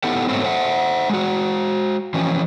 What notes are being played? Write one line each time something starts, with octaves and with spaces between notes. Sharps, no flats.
B3 D#4 E4 G4 A4 F#5
G#2 F#3 A3 B3 C4
C5 E5 F#5
G#3 F#4
E3 F3 C#4